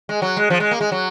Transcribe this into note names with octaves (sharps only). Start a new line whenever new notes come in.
G#3
F#3
G#3
F3
G#3
A#3
G#3
F#3